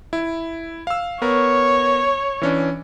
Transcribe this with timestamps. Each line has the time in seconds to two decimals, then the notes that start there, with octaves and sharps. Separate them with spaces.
0.13 E4
0.87 F5 E6
1.22 B3 A#4 C#5
2.42 E3 C#4 D4